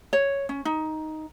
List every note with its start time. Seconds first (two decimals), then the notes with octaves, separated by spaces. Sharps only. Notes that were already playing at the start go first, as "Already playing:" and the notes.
0.13 C#5
0.49 C#4
0.65 D#4